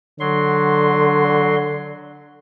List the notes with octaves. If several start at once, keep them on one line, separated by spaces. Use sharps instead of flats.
D3 F#3 C6